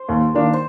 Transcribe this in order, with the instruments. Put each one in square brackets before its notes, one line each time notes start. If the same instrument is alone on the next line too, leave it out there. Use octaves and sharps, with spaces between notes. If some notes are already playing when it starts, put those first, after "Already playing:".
Already playing: [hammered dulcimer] C5
[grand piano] D#2
D#3 A#3 D4
[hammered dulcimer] C5